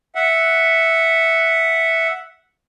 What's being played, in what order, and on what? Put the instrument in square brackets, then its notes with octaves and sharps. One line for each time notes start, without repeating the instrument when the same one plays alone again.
[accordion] E5 F#5